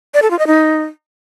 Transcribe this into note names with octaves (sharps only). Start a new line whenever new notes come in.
D5
A4
F4
D#5
D#4